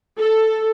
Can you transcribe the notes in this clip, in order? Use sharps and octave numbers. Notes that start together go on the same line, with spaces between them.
A4